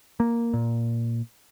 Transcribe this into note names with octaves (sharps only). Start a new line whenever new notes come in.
A#3
A#2